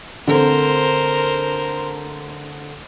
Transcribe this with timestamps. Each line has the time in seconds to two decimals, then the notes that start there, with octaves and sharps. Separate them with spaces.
0.28 D3 A3 C4 A#4 C5